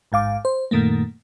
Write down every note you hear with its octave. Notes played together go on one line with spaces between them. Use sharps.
A1 G#2 F5 D6
C5
F#2 A#2 D#3 A3 A#3